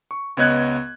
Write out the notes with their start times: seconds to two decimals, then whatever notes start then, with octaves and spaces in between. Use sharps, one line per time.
0.11 C#6
0.37 C#2 B3 C#5 D#5 F#6 G#6